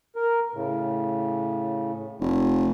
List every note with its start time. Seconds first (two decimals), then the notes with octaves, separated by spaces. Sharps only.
0.16 A#4
0.54 A2 C#3
2.20 F1